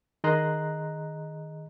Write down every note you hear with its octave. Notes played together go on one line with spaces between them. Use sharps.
D#3 G#4 D#5 A#5 C6 F#6